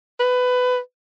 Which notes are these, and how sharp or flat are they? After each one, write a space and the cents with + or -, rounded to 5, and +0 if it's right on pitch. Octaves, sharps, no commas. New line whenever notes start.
B4 +20